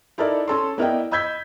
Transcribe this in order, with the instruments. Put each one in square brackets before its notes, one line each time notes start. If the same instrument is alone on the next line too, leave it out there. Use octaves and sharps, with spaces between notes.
[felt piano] D#4 E4 A4 A#4 D5
C#4 A4 C6
B3 E4 A#4 D5 D#5 G5
D#5 B5 E6 G6 G#6 B6